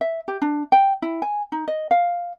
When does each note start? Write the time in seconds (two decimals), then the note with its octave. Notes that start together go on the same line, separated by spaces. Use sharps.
0.01 E5
0.28 G4
0.42 D4
0.72 G5
1.02 E4
1.22 G#5
1.52 D#4
1.68 D#5
1.91 F5